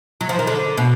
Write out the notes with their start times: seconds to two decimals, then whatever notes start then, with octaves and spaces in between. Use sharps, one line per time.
0.21 F#3
0.29 F3
0.39 D#3
0.47 D3
0.77 B2